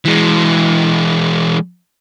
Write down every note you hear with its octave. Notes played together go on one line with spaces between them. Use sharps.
E3 G#3